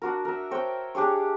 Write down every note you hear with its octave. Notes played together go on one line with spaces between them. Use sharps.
D4 F#4 A#4
A#4 E5
C5 C#5 G5
D4 G4 G#4 C#5